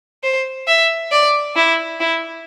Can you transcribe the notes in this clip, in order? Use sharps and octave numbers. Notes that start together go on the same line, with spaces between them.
C5
E5
D5
E4
E4